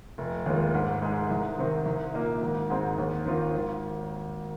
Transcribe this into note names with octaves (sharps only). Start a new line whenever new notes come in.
F1
D#2 D#3 G#3 F4
G#2
G#3 D#4 G#4
C2
C3 D#3 C4
C2
A#2 A#3 D#4
G#1
G#2 G#3 C4 D#4
D#2
D#3 C4 F4
G#1